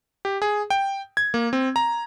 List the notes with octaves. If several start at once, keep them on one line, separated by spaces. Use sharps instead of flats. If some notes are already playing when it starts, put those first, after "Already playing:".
G4
G#4
G5
G#6
A#3
C4
A#5